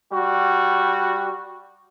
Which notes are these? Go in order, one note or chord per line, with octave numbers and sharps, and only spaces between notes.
G3 F#4